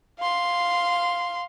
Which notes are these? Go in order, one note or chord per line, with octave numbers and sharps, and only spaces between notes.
F5 C6